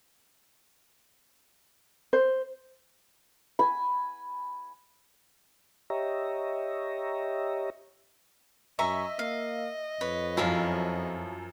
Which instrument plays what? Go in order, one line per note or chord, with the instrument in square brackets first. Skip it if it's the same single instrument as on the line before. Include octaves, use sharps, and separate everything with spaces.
[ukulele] C5
[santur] G#5 B5
[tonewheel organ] G4 C#5 D#5 E5 A#5
[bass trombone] F#2 [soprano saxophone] D#5 [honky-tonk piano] E5 [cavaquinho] G#5 A#5 C#6
[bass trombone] A#3 [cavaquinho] F5
[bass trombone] F2 [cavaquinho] B4 C#5
[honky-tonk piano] F#2 F3 [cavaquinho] E4 C#5 F5